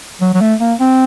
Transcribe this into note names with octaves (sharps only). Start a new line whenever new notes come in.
F#3
F#3
A3
A#3
C4